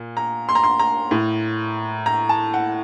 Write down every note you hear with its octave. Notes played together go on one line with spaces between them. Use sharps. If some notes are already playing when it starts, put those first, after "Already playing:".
Already playing: A#2
A#5
C6
A#5
C6
A#5
A2
A#5
A5
F#5